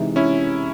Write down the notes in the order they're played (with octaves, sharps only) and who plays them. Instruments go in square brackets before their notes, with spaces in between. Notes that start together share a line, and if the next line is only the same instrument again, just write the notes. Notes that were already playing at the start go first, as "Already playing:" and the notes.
Already playing: [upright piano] C3 E3 G#3 D#4
[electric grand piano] C#4 E4